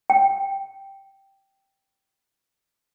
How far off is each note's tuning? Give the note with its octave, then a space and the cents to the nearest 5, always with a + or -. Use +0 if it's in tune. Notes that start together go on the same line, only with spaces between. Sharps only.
G5 -5